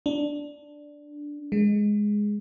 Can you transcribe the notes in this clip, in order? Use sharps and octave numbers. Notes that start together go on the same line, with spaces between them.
D4
G#3